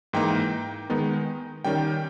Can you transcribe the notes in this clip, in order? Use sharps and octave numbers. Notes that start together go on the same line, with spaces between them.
G#2 E3 A#3 D#4 G5
D#3 G#3 B3 D#4
D#3 G3 C#4 G5